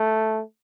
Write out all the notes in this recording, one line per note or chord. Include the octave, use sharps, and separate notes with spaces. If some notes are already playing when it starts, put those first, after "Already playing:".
Already playing: A3